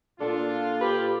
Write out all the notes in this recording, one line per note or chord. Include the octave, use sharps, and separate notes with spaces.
A#2 D4 F4 A4
G4 B4